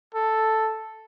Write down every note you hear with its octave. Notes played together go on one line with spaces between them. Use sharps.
A4